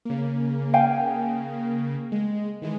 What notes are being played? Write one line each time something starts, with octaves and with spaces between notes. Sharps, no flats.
C#3 A#3
F5 G5 G#5
G#3
D#3 E3 G#3